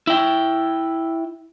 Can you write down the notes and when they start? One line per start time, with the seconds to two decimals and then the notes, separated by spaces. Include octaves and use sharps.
0.07 E4 G5